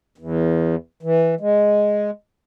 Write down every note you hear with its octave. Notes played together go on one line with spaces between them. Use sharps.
E2
E3
G#3